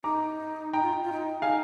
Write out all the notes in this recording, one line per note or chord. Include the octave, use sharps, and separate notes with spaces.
D#4 A#5 D6
D#4 G5 A#5
F4
D#4
F4
D#4
D#4 F5 G#5